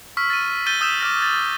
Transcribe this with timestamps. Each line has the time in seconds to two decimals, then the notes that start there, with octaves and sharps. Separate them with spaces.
0.17 C#6 E6 F6 B6
0.30 A6 D#7
0.66 E6 G6 A6 D#7 G7
0.81 D#6 E6 G6 B6 E7
1.00 D6 F6 A#6
1.22 A6